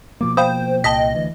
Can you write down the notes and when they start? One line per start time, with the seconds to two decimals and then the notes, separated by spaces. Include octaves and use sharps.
0.21 B2 F3 A#3 D6
0.37 C5 F5 G5 B5 D#6
0.84 C2 A#2 D#5 A5 D#6 B6
1.15 D2 E3